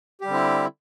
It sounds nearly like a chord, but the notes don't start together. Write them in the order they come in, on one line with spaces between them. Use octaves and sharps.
G4 G3 D3 C4 E4